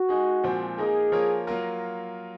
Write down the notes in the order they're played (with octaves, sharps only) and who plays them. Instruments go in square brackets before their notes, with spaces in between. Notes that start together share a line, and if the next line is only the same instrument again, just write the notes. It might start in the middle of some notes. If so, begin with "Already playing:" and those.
Already playing: [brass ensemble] F#4
[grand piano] G#3 D#4 G#4
A#2 F3 G#3 C4
[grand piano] A#3 D#4 A#4 [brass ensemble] G#4
[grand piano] F3 A#3 F4 A#4 C#5
F#3 A#3 F4 A#4